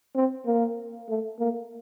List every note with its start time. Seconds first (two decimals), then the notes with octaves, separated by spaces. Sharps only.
0.15 C4
0.46 A#3
1.09 A3
1.39 A#3